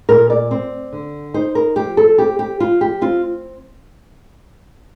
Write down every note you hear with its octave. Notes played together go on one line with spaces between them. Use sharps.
A#2 A#4
D5
C4
D3
D#4 C5
A#4
F3 G4
A4
C4 G4
G4
F3 F4
G4
C4 F4